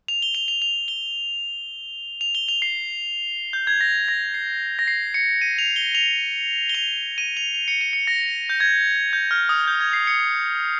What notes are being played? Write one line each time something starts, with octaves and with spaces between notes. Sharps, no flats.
F7
G7
F7
F7
F7
G7
F7
G7
F7
C7
G6
G#6
A#6
A#6
C7
A#6
C7
C#7
D#7
F7
G7
F7
G7
F7
D#7
F7
F7
C#7
D#7
C#7
A#6
G6
G#6
G6
F6
D#6
G6
G#6
C7
C#7